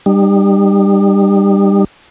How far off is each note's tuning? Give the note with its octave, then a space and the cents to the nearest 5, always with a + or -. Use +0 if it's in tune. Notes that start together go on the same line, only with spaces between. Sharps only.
G3 +15 D#4 -40